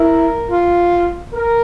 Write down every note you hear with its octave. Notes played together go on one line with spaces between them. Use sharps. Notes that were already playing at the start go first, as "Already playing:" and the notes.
Already playing: E4 A#4
F4
A#4